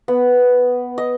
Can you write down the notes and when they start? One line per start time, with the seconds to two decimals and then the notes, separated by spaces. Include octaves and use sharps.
0.08 B3
0.98 D#5